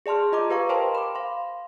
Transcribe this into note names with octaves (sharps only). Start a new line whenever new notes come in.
G#4 D5 A5 C6 F6
F4 D#5 A#5 D6
G4 B4 F5 A#5 C#6
A#4 C5 F5 G5 A5 C6
B5 D6
F5 C6